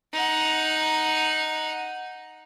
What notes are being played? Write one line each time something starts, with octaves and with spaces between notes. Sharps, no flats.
D#4 F#5